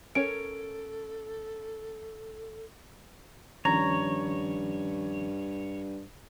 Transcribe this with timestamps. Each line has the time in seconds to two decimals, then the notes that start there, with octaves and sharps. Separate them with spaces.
0.15 C#4 A4 A#4 C#5 D7
3.65 G2 D#3 F3 C#4 C#5 A#5